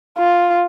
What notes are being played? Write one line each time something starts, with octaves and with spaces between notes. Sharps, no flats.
F4